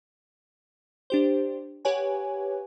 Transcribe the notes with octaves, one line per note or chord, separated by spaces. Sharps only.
D4 G4 C5
G4 B4 C#5 F#5 G#5